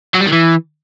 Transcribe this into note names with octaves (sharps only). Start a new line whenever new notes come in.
F#3
G3
D#3
E3